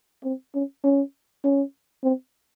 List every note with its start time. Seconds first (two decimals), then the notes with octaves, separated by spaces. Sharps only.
0.24 C4
0.55 C#4
0.84 C#4
1.45 C#4
2.04 C4